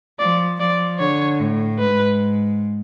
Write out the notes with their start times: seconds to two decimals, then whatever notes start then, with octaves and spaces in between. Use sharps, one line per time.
0.19 F3 D5
0.60 F3 D5
0.99 D3 C#5
1.39 A2
1.79 G#2 B4